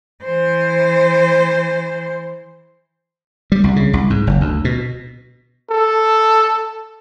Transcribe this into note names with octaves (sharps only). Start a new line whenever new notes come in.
E3 C5
G3
C2
C#3
C2
G#2
F#1
D2
B2
A4